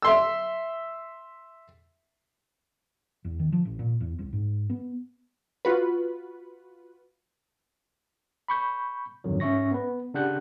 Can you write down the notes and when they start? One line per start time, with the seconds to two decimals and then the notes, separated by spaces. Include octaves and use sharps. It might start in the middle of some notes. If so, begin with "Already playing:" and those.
0.02 E5 C6 E6
3.25 E2
3.39 D#3
3.52 F3
3.65 A1
3.79 A#2
4.01 E2
4.19 C2
4.33 G#2
4.70 B3
5.65 F4 F#4 B4
8.48 B5 C#6 G6
9.24 F2 G#2 B2 D3 D#3 F#3
9.40 G#2 C#4 E5 C#6 A#6
9.71 B3 B4
10.14 C#3 D4 G4 F#5 F#6 G6